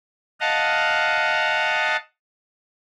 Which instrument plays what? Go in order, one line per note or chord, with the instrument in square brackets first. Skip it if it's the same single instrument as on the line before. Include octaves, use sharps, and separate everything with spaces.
[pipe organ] D#5 F5 F#5 A5